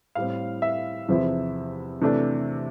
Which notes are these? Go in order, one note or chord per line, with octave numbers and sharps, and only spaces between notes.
A2 G3 C4 F5
E5
E2 C3 F3 C4 E4
C3 E3 A3 D4